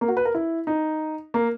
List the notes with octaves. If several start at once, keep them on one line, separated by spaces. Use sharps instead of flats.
A#3
F#4
B4
A#4
E4
D#4
A#3